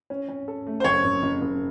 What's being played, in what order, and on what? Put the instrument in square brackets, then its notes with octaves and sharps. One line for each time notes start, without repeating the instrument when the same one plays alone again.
[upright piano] C#4
C#4
A4
A3
[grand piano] C5
[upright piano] F#1 [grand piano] C#5
[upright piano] F#1
F#1
F#1